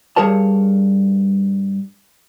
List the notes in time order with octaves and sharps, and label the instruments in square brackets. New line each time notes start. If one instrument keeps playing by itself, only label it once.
[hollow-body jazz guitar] G2 G3 G#4 A#4 C#5 A5